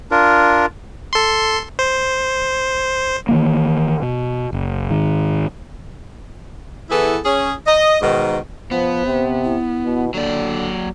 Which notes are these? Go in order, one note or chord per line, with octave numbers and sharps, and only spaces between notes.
D4 F4 A#4
A4 C6
C5
D#3 E3 A#3
B2
F#1
G#2 D#3
E3 B3 E4 G#4 A4
C#4 G#4
D#5
G#2 B2 D#3
F3 B3 C5
C3
E4
B2
D3 F#3 A#3 D5